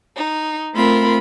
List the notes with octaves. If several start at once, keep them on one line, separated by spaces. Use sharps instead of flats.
D#4
A3 C4 F4 A#4 B5